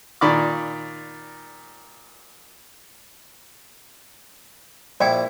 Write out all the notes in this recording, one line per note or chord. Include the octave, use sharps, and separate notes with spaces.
A#2 D#3 D5 B5 C#6 D6
A#1 E4 D5 G5 D6